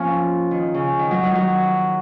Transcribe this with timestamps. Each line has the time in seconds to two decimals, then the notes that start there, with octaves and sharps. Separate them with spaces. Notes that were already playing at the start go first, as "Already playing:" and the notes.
Already playing: F3 A#3 C#4
0.51 D#3
0.74 C#3
0.99 D#3
1.11 F#3
1.23 D#3
1.35 F#3